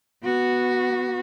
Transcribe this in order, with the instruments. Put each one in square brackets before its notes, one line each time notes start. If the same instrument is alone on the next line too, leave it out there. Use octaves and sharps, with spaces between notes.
[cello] B3 F#4